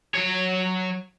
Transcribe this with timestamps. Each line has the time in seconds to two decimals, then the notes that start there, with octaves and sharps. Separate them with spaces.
0.15 F#3 C#5